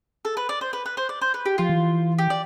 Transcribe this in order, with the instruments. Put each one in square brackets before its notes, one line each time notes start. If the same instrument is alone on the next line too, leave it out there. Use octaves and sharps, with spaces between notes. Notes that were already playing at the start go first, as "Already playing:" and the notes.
[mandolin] A4
B4
D5
C5
B4
B4
C5
D5
C5
B4
G4
[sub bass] F3 [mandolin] F4
[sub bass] E3
[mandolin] G4
D5